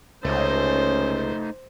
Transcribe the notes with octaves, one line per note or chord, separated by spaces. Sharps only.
C#2 A3 C#4 D#4 C5